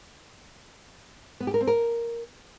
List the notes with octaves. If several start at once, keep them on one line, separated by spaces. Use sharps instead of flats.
B3
G4
A#4
C4
A#4